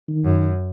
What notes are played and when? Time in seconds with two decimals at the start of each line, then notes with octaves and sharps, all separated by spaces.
0.09 D#3
0.24 F#2